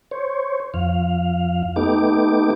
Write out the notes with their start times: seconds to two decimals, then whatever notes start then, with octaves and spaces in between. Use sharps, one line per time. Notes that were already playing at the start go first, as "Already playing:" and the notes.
0.11 C5 C#5
0.74 F2 F5
1.76 A3 B3 D#4 G4 D6